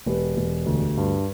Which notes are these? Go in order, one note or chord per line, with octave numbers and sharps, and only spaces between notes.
E1 G4 B4
E1
D2
G2